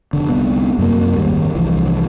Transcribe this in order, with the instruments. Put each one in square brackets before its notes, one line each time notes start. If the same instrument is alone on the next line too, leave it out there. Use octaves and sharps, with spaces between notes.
[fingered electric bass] F1 D3
C2 B3
F#2 C3 A3 A#3
G#1 D#2 G3
C2 E3 F3